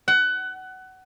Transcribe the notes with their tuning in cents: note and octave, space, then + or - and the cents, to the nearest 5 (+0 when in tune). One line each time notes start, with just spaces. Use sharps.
F#5 +20